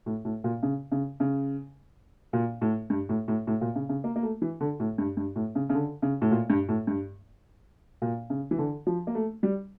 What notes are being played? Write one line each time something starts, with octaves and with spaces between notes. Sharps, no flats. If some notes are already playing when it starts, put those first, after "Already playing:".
A2
A2
A#2
C#3
C#3
C#3
A#2
A2
G2
A2
A2
A2
A#2
C#3
C#3
A#3
A#3
A3
E3
D3
A2
G2
G2
A2
C#3
C#3
D3
C#3
A2
A#2
G2
A2
G2
A#2
C#3
E3
D3
F3
A#3
A3
G3